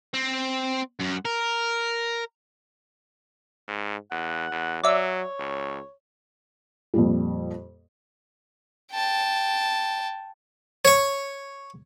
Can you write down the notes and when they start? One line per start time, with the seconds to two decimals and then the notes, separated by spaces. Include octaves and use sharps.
0.14 C4
1.00 F#2
1.25 A#4
3.68 G#2
4.11 E2 F#5
4.52 E2
4.84 F#3 C#5 D5 E5
5.39 C#2
6.94 F2 A#2 G3
8.93 G5 A5
10.85 C#5 C#6